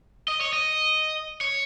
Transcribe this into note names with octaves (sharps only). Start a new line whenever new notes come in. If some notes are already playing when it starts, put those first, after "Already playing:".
D#5
C#5
D#5
C#5